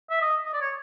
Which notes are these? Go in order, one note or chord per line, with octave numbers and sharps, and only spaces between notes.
E5
D#5
D#5
D5
C#5